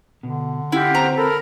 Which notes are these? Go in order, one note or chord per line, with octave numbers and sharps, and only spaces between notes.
B2 D3
C#4 E4 F4 G4 F#5
C4 C5 C#5 A#5
A4 A#4 B5